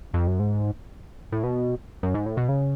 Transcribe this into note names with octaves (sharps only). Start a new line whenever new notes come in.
F2
F#2
G#2
A2
B2
F#2
G#2
A2
B2
C#3